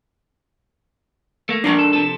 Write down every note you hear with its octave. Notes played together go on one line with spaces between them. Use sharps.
A3 A#3
G2 F3 A#3 D4 A#4 A#5
G#2 A4
C3 F3 A4